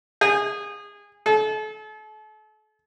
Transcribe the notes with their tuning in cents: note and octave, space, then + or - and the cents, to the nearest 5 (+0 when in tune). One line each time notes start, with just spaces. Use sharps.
G#4 -25
A4 -40